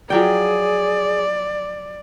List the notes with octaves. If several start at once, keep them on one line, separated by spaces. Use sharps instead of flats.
F3 F#3 G#4 D5 G5